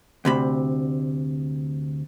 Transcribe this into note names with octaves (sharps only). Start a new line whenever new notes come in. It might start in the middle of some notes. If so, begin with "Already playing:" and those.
D2 C3 B5